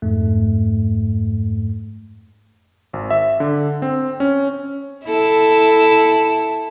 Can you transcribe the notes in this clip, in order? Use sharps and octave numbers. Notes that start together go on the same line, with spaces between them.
F2 G#2 A3
G#1
E5
D3
C4
C#4
E4 A4